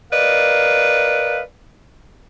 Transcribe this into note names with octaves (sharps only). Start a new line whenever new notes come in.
A#4 B4 D5 D#5 F5